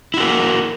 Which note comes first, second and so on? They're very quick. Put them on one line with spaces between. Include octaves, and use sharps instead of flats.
E4 F#4 A#4